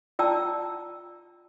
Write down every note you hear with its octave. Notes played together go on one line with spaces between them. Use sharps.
F4 D5 G5 A5 A#5 E6